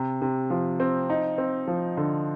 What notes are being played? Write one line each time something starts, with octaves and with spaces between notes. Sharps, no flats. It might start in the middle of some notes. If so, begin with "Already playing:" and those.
Already playing: C3
C3
F3
C4
D#4
C4
F3
D3